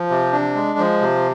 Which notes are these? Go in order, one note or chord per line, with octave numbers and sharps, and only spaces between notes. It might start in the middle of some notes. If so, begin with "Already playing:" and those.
Already playing: F3
C3
D4
G#3
F3
C3